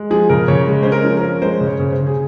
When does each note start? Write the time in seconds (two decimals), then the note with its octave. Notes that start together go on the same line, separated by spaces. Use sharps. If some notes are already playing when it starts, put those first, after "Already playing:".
Already playing: G#3
0.11 F3 G#4
0.29 C#3 A#4
0.48 C#3 C#5
0.67 G#3
0.83 C#4 C5
0.92 A#4
1.04 F3
1.17 A#4
1.23 C#4
1.42 G#3 C5
1.61 C#3
1.67 C#5
1.79 C#3
1.93 C5
1.98 C#3
2.07 G#4